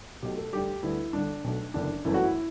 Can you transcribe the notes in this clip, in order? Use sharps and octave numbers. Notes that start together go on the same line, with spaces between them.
B1 B2 A3 G4
A4
D2 D3 G3 G4
D2 D3 G3 B3 E4
G1 G2 D3 D4
B1 B2 A3
F#1 E2 D3 D4
G1 F#2 E3 A3 E4
F#4
E4